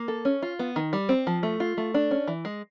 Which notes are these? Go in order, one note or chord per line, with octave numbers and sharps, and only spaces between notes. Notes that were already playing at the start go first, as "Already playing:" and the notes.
Already playing: A#3
A4
C#4
F4
B3
D#3
G3
C4
F3
A3
F4
A3
D4
C#4
E3
G#3